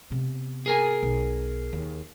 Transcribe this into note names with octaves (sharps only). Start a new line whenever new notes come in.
C3 B3
G#4 A#4 G#5
B1
D#2